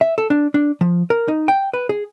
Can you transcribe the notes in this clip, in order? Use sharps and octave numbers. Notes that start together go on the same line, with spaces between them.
E5
A4
D4
D4
F3
A#4
D#4
G5
B4
G#4